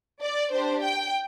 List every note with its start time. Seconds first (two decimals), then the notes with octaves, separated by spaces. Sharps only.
0.22 D5
0.52 D4 G4 C5
0.83 G5